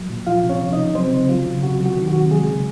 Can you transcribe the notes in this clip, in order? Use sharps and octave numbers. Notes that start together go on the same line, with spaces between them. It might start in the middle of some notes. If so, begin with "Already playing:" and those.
Already playing: F#3
A#2
F3 F4 F5
C3
C#4 C#5
F3
D#4 D#5
C3
F#3 C4 C5
C#3
F#3 F4
C#3
C3 F#4
F#3
F#4
D#3
F#4
C3
F#3 G#3 G#4
C#3